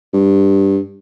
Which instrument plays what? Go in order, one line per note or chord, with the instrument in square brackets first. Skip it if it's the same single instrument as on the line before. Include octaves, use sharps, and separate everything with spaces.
[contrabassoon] G2